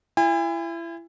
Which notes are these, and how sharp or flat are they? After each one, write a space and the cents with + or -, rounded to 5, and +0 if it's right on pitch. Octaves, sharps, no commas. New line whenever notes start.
E4 +30 G#5 -40